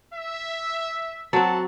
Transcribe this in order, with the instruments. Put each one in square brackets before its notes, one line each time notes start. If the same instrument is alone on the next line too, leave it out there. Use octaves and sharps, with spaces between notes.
[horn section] E5
[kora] F#3 C4 [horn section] A4 F#5 [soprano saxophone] A5